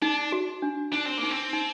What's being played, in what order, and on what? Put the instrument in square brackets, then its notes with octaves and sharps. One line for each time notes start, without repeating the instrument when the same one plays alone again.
[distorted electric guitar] D4 [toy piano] D#4
[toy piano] F#4
D4
[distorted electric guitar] D4 [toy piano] D#4
[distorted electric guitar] C4
A#3
[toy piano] D#4
[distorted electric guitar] C4
[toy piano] D#4